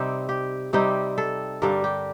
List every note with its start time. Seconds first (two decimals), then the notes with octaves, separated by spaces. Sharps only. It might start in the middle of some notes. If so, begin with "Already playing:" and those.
Already playing: C3 G3 C4 D#4 G4
0.29 G4
0.73 C3 G3 C4 D#4 G4
1.18 A4
1.62 G2 D3 G3 D4 A#4
1.84 G4